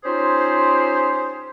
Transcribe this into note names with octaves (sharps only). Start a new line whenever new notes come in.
C#4 D#4 F4 G4 G#4 C5